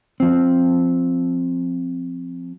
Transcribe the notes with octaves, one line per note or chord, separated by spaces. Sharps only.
F3 C4